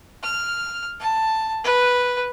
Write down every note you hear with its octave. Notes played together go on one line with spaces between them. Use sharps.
F6
A5
B4